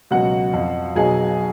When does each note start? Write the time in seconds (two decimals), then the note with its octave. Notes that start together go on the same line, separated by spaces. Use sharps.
0.11 C#2 B2 F#3 F#4 F#5
0.53 F2 F3
0.95 B1 B2 F#3 G#4 G#5